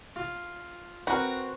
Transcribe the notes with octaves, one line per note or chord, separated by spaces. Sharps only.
F4
C4 F#4 A#4 B4